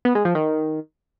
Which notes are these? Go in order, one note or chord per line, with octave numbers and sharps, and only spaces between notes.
B3
G#3
F3
D#3